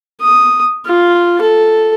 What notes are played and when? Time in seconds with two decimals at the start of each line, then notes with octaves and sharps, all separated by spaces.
0.21 D#6
0.86 F4
1.41 A4